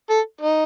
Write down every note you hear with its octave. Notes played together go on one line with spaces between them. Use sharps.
A4
D#4